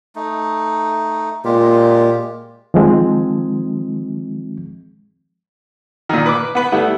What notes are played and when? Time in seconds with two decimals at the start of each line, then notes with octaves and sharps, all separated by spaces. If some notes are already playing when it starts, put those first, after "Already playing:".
0.16 A3 D#4
1.45 A#2 G#3 F4 G4
2.74 D#3 F3 G#3 C4
6.09 A#2 D#3
6.26 B4 D6
6.55 B3 B4
6.72 G3 A3 B3 E4